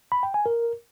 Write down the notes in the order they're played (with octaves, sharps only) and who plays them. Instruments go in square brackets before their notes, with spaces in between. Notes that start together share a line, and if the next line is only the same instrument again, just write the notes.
[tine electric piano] B5
G5
G#5
A#4